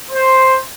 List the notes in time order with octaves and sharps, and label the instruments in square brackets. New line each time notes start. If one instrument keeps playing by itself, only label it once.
[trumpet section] C5